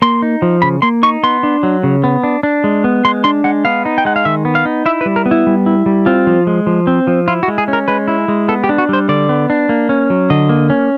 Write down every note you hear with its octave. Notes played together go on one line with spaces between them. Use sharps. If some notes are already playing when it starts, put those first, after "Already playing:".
A#3 C6
D#4
F3
C#3 B5
A#3 C6
D#4 C#6
B3 C6
D4
F#3
C#3
B3
D4
D4
G#3
B3
G#3 C6
D4 C6
G#3 F#5
B3 F5
D#4
G5
G#3 F#5
F5
D#3 E5
B3
F5
D#4
E4 E5
B4
G3
A#4
B3
E4
G3
E4
G3
C4 F4
F3
G#3
F3
C4
F3
E4 F4
F#4
G#3
G#4
C#4
A#4
G#3 B4
E4
G#3
B3 A4
G4
D4
F#4
G3 C5
D3 D5
B3
D4
A#3
C#4
F#3
D3 D#5
A#3
C#4